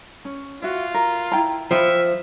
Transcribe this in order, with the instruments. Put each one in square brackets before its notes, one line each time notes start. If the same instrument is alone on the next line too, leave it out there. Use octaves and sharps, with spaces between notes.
[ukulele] C#4
[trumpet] F4 [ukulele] F#4 E5
[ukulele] A#4
E4 G5 A#5
[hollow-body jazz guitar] F3 [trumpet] E5 [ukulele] G5 B5